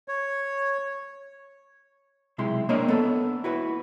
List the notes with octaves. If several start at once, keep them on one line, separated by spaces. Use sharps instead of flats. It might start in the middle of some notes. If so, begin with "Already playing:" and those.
C#5
B1 C3 G#3 E4 C6
A#3 C4 D4 A#4 C#5 D#5
B3 A4
E4 F#4 B4